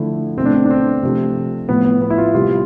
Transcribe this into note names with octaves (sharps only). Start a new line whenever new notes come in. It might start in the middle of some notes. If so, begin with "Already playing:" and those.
Already playing: D3 F3 A3 E4
B2 A3 C4 D4
C4
D4
C4
C3 F3 A3
A2 F3 A3 B3
B3
B3
E4
F4
C3 G3 F4